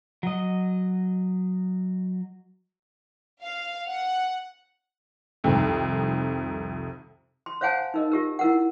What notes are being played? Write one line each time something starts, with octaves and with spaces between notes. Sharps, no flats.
F#3 D#5
F5
F#5
C2 F2 D#3
C6
C5 C#5 F5 F#5 G#5 A5
D#4 A#4 D#5
F4 G4 A#4
E4 A#4 F#5